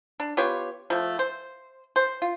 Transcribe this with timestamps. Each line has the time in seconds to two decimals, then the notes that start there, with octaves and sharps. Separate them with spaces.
0.20 D4
0.37 B3 F4 G4 C#5
0.90 F3 A3
1.19 C5
1.96 C5
2.22 F4